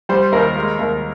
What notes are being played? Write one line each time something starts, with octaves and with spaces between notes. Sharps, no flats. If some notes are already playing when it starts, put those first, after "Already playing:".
G3 C5
D#2 A#4
G#3
D#2